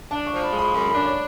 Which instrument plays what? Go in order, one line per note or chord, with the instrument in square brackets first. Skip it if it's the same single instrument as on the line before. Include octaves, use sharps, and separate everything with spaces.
[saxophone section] D4 [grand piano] A5
[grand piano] C#6
[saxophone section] F3
[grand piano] B5
[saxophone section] G#3
[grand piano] B5
[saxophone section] F#2 [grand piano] B5
[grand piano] B5
[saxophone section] D4
[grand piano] C#5